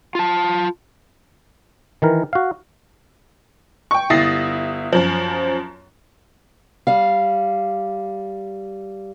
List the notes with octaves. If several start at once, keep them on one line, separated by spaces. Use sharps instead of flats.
F4 A5
D#3 E3 A#4
F#4 F5
G5 C#6
G1 E4 D#6 A6 A#6 C7
F#2 F3
G3 F5